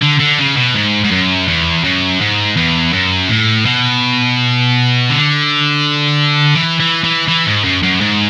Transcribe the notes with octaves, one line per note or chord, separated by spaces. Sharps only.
D3
D3
C#3
B2
G#2
G#2
F#2
E2
F#2
G#2
E2
F#2
A2
B2
D3
E3
E3
E3
E3
G#2
F#2
F#2
G#2